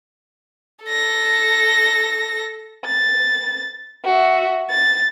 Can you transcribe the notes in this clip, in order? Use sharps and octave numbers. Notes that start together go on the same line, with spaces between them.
A4 A#6
A6
F#4 E5
A6